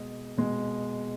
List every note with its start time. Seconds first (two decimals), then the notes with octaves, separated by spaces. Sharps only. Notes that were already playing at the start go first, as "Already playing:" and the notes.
Already playing: B2 G#3 D#5
0.37 B2 G#3